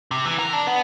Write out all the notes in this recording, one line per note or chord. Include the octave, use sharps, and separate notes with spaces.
C3
E3
A#4
D4
B3